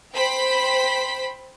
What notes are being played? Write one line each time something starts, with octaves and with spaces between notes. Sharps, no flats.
C5 G5 B5 B6